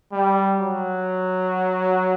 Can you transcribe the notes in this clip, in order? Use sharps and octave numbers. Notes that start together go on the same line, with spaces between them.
G3
F#3